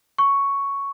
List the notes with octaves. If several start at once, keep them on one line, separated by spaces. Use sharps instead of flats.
C#6